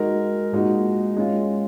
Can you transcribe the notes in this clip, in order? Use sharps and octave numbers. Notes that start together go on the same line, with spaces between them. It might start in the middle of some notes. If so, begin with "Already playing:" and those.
Already playing: G#3 D#4 F#4 A#4
A#2 G#3 D#4 F#4
G#3 C#4 F4